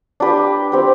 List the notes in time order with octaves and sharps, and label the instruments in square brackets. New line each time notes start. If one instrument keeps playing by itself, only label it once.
[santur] D4 G4 B4
C4 G4 B4